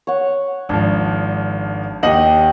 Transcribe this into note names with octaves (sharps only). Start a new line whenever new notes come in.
C#5 F#5
G#1 F3 D4
D#2 G4 D#5 F#5 F#7